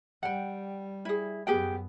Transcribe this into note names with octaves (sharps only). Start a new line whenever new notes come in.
G3 F#5 G5
E4 G#4
F#2 B3 G4 G#4 G5